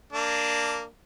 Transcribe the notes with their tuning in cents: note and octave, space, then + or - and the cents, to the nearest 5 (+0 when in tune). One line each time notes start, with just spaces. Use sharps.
A#3 -10 D4 +0